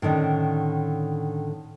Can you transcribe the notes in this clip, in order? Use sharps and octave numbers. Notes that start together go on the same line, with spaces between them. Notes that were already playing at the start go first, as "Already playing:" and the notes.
A2 D3 D#3 C#4 D4